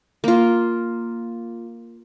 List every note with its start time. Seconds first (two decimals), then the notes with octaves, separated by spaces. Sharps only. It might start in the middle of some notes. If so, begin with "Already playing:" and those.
0.24 A#3 F4